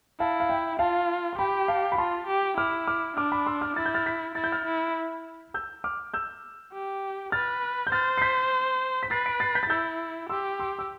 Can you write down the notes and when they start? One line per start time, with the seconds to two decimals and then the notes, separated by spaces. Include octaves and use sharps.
0.19 E4 F5 A5
0.40 F5
0.49 E5 G5
0.79 F4 F5 A5
1.33 C6
1.38 G4 G5 B5
1.68 F5 A5
1.92 B5
1.98 F4 A5 C6
2.27 G4
2.57 E4 D6 F6
2.87 D6 F6
3.17 D4 D6 F6
3.32 B5 D6
3.46 C6 E6
3.61 D6 F6
3.76 E4 A6
3.86 G6
3.94 F6 A6
4.06 G6 B6
4.35 E4 A6
4.44 G6
4.52 F6 A6
4.65 E4
5.54 E6 G6
5.84 D6 F6
6.14 E6 G6
6.73 G4
7.32 B4 F6 A6
7.87 G6
7.92 C5 F6 A6
8.18 C7
8.21 G6 B6
9.03 B6
9.11 B4 A6 C7
9.26 B6 D7
9.40 A6 C7
9.55 G6 B6
9.63 A6
9.70 E4 E6 G6
10.29 G4 C6 E6
10.59 C6 E6
10.79 E6